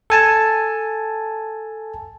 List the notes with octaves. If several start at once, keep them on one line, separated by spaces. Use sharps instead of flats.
A4 G#5 A5